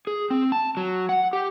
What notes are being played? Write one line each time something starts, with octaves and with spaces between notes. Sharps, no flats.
G#4
C4
A5
F#3
F#5
G4